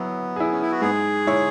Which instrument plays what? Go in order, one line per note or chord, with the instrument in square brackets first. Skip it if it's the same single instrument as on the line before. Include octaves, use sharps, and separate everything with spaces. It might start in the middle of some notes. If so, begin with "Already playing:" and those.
Already playing: [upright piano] F#3 E4 [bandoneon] B3
[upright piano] E4 G#4
[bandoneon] C#4
E4
F#4
[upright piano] G#2 [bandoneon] G#4
[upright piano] G#3 E4 C#5